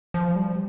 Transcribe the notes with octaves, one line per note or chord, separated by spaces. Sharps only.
F3
G3